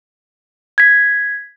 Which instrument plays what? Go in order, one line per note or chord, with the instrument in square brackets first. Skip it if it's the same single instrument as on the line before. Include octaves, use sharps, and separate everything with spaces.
[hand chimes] G#6 B6